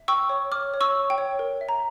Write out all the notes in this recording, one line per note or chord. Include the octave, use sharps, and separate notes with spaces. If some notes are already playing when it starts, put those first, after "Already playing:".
Already playing: E5
G5 C#6 E6
C#5
C#5 D6 F6
C#5
C#6 E6
C#5
G5
C#5
A#4
E5
A#5